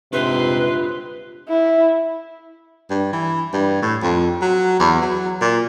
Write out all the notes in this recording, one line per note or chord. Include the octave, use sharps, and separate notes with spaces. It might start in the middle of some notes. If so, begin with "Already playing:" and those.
G#2 C3 C4 D4 F4 B4 C#5 C6
E4
G2
E3
G2
A2
F2
F#3
E2
F#3
A#2